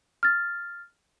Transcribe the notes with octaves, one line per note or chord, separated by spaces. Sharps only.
F6 A6